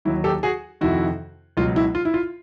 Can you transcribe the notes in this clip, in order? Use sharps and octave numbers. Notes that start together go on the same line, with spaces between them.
D#2 D#3 F#3 E4
G4 A4
F#4 G#4
F2 C3 D#3 E4 F#4
C#2 B2 F#3 F4
E4
F4
E4
F4